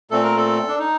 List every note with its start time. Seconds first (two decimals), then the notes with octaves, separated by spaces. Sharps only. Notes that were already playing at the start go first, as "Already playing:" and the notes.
0.11 A#2 A3 C4 A4
0.24 A#4
0.37 A4
0.68 D4
0.79 D#4